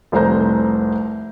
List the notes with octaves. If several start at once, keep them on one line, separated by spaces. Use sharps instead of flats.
F1 C2 C5 A#5 G6